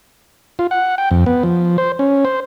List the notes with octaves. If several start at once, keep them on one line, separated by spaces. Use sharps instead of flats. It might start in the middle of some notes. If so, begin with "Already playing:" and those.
F4
F#5
G5
F2
B3
F3
C5
C#4
C5